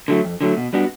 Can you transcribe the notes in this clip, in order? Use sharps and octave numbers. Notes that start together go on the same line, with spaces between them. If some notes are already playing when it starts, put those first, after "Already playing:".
D3 F#3 A3
F2
D3 F#3 A3
B2
G3 B3 D4 F#4